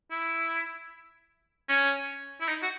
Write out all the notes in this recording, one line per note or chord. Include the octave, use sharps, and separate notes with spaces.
E4
C#4
E4
D#4
F#4